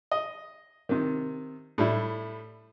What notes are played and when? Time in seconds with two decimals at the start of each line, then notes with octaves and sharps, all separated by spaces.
0.11 D#5
0.89 C3 D#3
1.78 A2 G3 E4